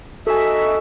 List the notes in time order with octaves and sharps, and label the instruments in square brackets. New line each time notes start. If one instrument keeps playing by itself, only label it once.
[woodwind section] D#4 F#4 E5 [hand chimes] A4 G#5